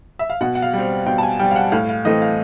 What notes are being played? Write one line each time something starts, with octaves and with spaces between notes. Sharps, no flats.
E5
F5
B2 F#5
F#5
F5
G3 C4
B2 G5
A5
G#5
G3 C4 G5
F5
F#5
A2 F5
F5
E3 A3 C4 D#5
F5